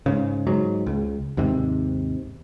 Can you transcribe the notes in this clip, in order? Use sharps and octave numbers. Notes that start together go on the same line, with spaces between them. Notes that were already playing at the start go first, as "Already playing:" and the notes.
G#2 C#3
G#2 F#3
C#2
D#2 G#2 C3